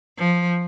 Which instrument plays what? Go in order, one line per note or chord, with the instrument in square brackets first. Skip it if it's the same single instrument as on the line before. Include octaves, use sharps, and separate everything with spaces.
[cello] F3